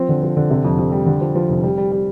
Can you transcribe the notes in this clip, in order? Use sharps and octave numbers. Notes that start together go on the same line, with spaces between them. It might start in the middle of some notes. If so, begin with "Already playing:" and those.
Already playing: F3 C4
D3
F3
D3
C3
F2
F2
G3
D3
F3
F3
F1
G3
G3
G3